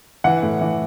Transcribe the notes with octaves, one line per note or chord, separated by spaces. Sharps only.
E3 F#5
A2
E3